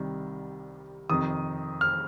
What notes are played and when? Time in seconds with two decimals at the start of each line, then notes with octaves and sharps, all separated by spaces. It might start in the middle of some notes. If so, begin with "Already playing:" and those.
Already playing: C2 C3 D#3 G3
1.09 F2 C3 D#3 D#6
1.81 F6